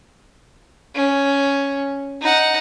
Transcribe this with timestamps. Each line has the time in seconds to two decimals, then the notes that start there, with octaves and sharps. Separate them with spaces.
0.95 C#4
2.22 D#4 F#5